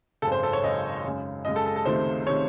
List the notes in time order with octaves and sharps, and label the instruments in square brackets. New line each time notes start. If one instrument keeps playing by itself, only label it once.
[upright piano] G#1 F#2 C#3 A4
C5
A4
C#5
G#1 F#2 C#3 D#5
F#2 C#3 G#3
F#2 C#3 G#3 D#5
A4
A4
A4
C#2 C3 D#3 A3 C4 C5
C3 D#3 A3 C4 C#5